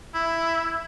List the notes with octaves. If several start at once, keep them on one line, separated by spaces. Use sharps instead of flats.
E4